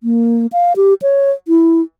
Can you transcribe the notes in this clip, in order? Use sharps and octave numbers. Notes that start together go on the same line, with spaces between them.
A#3
F5
G4
C#5
E4